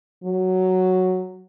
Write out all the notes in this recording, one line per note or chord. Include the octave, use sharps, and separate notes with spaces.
F#3